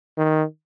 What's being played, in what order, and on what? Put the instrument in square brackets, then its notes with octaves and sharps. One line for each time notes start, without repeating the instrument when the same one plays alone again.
[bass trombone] D#3